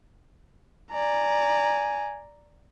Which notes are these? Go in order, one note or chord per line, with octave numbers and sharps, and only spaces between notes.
D5 G#5 A#5